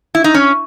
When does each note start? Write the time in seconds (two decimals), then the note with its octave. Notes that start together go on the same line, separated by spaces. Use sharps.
0.15 E4
0.24 D#4
0.34 C#4